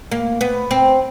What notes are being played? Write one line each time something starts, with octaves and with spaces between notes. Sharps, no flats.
A#3
B3
C4